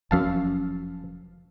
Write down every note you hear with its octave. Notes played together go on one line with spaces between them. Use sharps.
F1 F#2 F3 C#4 F5 A5